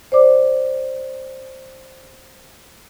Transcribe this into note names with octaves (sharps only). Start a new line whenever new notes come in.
C5 D5 D6